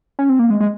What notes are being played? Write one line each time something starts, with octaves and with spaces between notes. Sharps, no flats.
C#4
C4
A#3
G#3
G#3